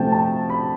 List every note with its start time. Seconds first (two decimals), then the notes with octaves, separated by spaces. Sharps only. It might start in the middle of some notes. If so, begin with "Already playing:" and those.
Already playing: C3 F3 A3 G5 A5
0.12 A5
0.49 B5